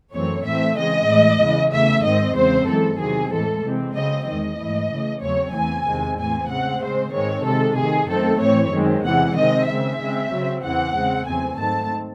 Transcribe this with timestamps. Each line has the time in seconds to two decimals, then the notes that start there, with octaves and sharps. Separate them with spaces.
0.14 F#2 E3 A3 C4 C#5
0.46 A2 E3 A3 C4 E5
0.78 C#3 E3 G#3 C4 D#5
1.09 A2 E3 G#3
1.41 E2 C#3 E3 G#3
1.73 E2 C#3 E3 A3 E5
2.05 G#2 D#3 G#3 C4 D#5
2.36 E2 C#3 G#3 C4 C5
2.68 F#2 E3 G#3 A4
3.00 E2 C3 D#3 F#3 C4 G#4
3.32 A2 E3 G#3 A4
3.65 C3 E3 G#3 C4
3.95 C#3 F#3 C4 D#5
4.27 E2 D#3 G#3 D#5
4.59 G#2 E3 A3
4.92 C#3 E3 A3
5.23 E2 C#3 F#3 A3 C4 C#5
5.54 E2 C#3 E3 C4 G#5
5.87 E2 C3 D#3 G#3 C4
6.19 A2 E3 C4 G#5
6.50 C#3 G#3 C4 F#5
6.82 C#3 G#3 C4 C5
7.13 G#2 D#3 G#3 C4 C#5
7.45 C3 D#3 G#3 A4
7.77 C3 D#3 A3 G#4
8.10 F#2 D#3 A3 C4 A4
8.41 A2 E3 C4 C#5
8.73 F#2 D#3 G#3 C4
9.04 E2 C3 E3 G#3 F#5
9.37 C3 D#3 G#3 C4 D#5
9.68 C#3 G#3 C4 E5
10.00 C#3 G#3 C4
10.32 C#3 F#3 C4
10.63 E2 C#3 E3 C4 F#5
10.95 C#3 G#3 C4
11.27 E2 C#3 F#3 A3 C4 G#5
11.59 G#2 D#3 A3 C4 A5